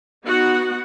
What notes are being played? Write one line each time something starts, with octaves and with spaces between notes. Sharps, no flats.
B3 D#4 F#4 F#5